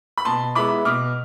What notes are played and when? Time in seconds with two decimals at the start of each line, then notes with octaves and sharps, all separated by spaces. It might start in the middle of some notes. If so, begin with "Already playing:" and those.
0.18 B5
0.25 B2 A5 C6
0.55 G#3 B3 E4 B5 D6
0.85 B2 D6 F6